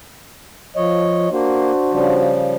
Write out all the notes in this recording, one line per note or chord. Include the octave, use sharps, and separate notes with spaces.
F3 C#5 D#5
A#3 D4 F#4 C5
C#3 F3 G3